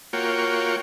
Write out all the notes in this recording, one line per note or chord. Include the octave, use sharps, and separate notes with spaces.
A#3 F4 F#4 C#5 G5